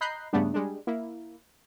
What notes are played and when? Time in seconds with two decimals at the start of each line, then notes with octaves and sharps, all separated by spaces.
0.01 D#5 A#5 B5 F#6 G6 C7
0.33 G2 C#3 G3 A3 B3 D4
0.54 G3 G#3 D4
0.87 A#3 E4